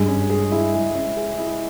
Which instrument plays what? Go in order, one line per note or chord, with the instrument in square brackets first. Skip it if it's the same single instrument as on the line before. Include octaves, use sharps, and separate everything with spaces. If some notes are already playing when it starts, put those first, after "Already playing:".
Already playing: [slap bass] G2 [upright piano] G#3
[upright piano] C#4
G#4
E4
G#3
C#4
G#4
E4